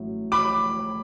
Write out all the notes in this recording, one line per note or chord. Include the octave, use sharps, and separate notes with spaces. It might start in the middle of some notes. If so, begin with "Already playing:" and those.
Already playing: A1 A2 F#3
B5 D6